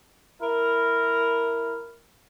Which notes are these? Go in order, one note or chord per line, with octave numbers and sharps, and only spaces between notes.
E4 A#4